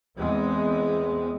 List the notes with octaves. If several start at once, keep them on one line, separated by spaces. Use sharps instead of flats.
E2 G#3 B3 C4